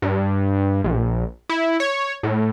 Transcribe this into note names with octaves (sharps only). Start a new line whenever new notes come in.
G2
A#1
E4
C#5
A2